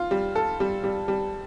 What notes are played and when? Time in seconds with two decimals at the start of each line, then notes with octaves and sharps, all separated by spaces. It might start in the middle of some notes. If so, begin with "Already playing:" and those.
Already playing: F4
0.11 G3
0.35 A4
0.60 G3
0.84 G3
1.08 G3